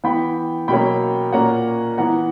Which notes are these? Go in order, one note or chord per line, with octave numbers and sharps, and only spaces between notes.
E3 B3 G5 B5
B2 F#3 A#3 C#4 G5 B5
A#2 A#3 C#4 F#5 A#5
E3 B3 F#5 A#5